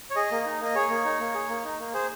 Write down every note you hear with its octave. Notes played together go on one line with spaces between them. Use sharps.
C#5
G#4 D#5
A#3
D#4
A#3 D#5
G#4 C#5
A#3
D#4
A#3
G#4
A#3
D#4
A#3
G#4 C5